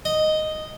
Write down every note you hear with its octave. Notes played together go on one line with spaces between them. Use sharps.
D#5